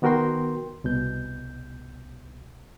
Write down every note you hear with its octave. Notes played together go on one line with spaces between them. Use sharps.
D#3 B3 F#4 A#4 G5 C6
C2 B2 G6